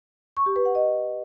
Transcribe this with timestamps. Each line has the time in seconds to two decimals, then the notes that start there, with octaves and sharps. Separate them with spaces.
0.37 C#6
0.46 G4
0.56 B4
0.65 F#5
0.75 D#5